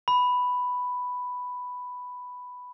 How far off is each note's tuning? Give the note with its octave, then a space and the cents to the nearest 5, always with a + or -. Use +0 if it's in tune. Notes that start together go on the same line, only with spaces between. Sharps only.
B5 +5